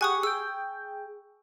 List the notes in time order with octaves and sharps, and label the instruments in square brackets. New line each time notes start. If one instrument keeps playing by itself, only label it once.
[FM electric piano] G4 G#4 F#5 [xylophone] G#5 C#6 D#6
[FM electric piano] G#4 G5 [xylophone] E6